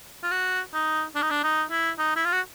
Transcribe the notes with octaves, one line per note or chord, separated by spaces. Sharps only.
F4
F#4
D#4
D4
D#4
D4
D#4
E4
D#4
E4
F4
F#4